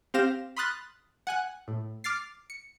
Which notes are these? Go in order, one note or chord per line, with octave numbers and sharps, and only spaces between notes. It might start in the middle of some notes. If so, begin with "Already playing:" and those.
C4 G4 F5 A#6 E7
B5 C6 D#6 F6 F#6 A6
F#5 G#5 F#6
A2
D6 F6 A6 C7
C#7